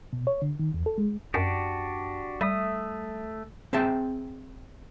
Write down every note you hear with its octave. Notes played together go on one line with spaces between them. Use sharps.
B2
C#5
D3
D#3
E2
A4
G#3
F#2 D4 F#4 G4
G3 A3 E5 D#6
C4 G#4 E5 G5 A5